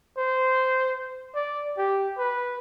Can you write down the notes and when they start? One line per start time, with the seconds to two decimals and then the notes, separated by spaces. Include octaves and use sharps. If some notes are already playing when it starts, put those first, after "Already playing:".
0.18 C5
1.35 D5
1.78 G4
2.18 B4